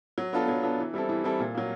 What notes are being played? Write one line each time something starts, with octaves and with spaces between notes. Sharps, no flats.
F#3
B3 D4 F4 A4
F#3
B3 D4 F4 A4
E3
G3 C4 E4 A4
E3
G3 C4 E4 A4
A#2
F#3 A#3